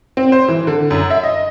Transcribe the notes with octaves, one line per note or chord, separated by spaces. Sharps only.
C4
C5
E3
D3
F#2
E5
D#5